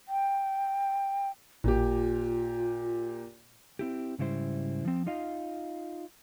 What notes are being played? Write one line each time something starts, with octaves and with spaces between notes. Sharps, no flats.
G5
A1 A#2 F4 G4
C4 E4 G4
G#2 C#3 G3 E4 C5
F3 C4
D#4 F4 D#5 F5